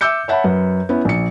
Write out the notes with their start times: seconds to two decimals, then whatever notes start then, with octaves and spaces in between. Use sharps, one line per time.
0.01 E5 D6 E6 G6 C#7
0.28 C#5 E5 F#5 A5 B5
0.44 F#2 B4
0.89 B3 C#4 E4
1.05 A#1 C#7